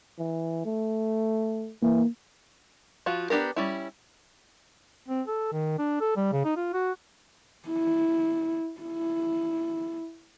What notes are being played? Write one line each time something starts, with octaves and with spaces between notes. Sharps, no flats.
E3
A3
E3 A#3
F3 F4 F#4
B3 D4 G4 A#4
G3 C#4 E4
C4
A4
D#3
D4
A4
G3
C#3
D#4
F4
F#4
E4
E4